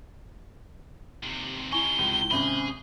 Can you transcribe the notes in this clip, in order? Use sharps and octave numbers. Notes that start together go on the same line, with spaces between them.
D#2 C3
C3 D#4 E4 G#5 C#6 G7
C#2
G#1 C3 C#4 G#4 B5